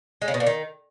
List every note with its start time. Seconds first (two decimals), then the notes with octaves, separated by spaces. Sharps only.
0.22 G#3
0.28 C#3
0.34 B2
0.40 A#2
0.47 D#3